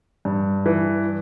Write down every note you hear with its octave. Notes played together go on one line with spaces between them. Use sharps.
G2
E3